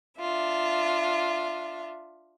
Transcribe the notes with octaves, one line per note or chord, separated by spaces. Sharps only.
D4 F4 E5